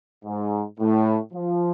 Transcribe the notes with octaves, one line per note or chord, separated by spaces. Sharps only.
G#2
A2
F3